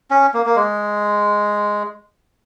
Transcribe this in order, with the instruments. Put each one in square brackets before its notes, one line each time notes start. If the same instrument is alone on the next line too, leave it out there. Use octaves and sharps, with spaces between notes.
[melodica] C#4
A#3
A#3
G#3